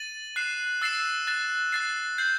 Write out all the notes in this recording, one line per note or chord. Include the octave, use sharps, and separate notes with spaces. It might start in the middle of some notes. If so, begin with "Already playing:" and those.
Already playing: A6 D#7 F#7
F#6 C7 E7
E6 A6 C7 E7
F#6 A6 E7
F#6 A6 C7
G6 C7 F#7